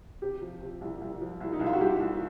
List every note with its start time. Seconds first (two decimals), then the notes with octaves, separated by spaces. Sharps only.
0.22 C3 G4
0.42 F3
0.62 C3
0.81 C2
1.01 C2
1.21 F3
1.40 C2
1.53 D#4
1.59 C2 E4
1.66 F4
1.73 F#4
1.81 C2 G4
2.00 C2